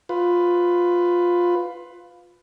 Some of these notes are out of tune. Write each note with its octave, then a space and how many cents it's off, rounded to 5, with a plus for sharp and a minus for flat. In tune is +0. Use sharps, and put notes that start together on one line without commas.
F4 +15 B4 +15